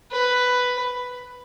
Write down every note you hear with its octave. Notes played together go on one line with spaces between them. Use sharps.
B4